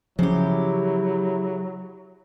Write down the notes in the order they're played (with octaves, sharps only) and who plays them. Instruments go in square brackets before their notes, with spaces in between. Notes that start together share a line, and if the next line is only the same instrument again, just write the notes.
[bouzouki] C#3 G4 [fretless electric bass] F3 C#4 [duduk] F#3 [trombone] E4